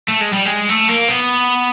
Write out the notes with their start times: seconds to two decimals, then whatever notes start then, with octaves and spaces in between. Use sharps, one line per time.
0.08 A3
0.21 G#3
0.33 G3
0.45 G#3
0.69 A3
0.88 A#3
1.08 B3